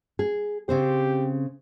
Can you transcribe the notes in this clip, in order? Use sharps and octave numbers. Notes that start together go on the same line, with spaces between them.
G#4
C#3 C4 G4 C5